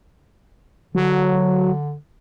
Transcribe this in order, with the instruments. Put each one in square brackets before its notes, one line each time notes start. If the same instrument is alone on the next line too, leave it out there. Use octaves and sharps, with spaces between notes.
[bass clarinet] D3 [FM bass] F#3